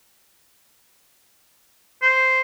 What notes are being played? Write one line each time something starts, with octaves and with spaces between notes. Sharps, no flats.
C5